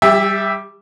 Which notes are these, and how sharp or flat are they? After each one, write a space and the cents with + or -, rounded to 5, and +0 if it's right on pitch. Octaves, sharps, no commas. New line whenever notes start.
G3 +0 G4 +45 E5 +0